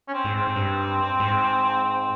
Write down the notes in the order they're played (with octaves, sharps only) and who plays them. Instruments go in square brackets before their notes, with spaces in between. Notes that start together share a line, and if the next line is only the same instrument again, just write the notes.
[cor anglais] C#4
C4
[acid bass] G#2
[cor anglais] C4
[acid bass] G2
G#2
[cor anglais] C4